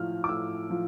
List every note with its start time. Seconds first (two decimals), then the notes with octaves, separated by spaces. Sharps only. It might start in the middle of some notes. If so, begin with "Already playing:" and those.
Already playing: A2 F3 F6
0.24 D6
0.29 A2 E6
0.70 F3